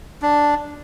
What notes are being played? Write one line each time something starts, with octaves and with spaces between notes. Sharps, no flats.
D4